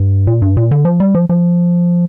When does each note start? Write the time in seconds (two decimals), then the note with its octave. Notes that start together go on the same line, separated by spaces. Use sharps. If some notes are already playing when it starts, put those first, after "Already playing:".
Already playing: G2
0.27 A#2
0.42 G2
0.57 A#2
0.71 D3
0.85 F3
1.00 G3
1.15 F3
1.29 F3